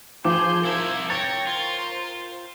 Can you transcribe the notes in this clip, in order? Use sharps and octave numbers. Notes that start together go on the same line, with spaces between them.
F3 G#4 C6 D6 G6 E7
C2 E4 A#4
C#5 G5 A6 A#6
F4 A#4 C5